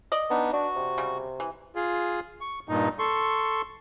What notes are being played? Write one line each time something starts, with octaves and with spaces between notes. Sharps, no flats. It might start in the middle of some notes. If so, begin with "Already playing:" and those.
D5 D#5
B3 D4 D#4
D4 F#4
C3
C#3 G3
E3
F4 G#4
C#6
G2 A#2 D#4
A4 C6 C#6